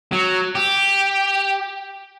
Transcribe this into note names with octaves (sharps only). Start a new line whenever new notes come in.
F#3
G4